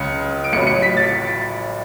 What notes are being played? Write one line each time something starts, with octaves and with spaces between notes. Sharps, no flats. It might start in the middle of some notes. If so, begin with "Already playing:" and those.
Already playing: C#2 C#3 C#7
D7
A1 A2 F#3 C#7
C#7
B6
A6